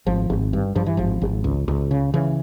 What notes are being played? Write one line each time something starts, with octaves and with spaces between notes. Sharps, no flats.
G#1 F3
G#1
G2
G2 F3
E3
G#1 F3
G#1
C#2
C#2
C#3
C#3 E3